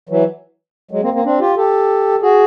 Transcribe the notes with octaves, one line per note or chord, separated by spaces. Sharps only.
E3 F#3
F#3 G#3
A#3 C4
A#3 C4
C4 D4
F4 G4
G4 A4
F#4 G#4